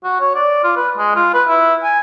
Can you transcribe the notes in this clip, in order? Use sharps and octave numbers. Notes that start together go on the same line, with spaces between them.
F#4
C#5
D5
F4
B4
G#3
F4
B4
E4
G#5